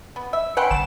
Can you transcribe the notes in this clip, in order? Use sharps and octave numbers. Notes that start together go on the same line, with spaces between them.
B3
E5
C#3 B4 F#5 G5 C6
G1 A5 E7